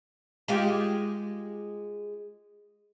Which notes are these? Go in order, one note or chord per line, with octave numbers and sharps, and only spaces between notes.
G#3 F4 G4